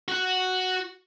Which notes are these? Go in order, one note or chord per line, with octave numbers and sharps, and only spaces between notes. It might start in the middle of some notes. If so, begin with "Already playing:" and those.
F#4 F#5